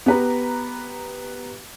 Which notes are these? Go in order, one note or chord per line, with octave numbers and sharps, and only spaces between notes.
B3 G4 B4 A#5